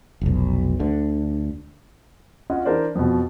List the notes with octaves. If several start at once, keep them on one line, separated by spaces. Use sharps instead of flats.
F1 B1
D2 D3
C#4 F4 D#5 F#5
E3 D4 A#4 C5 D5
F2 B2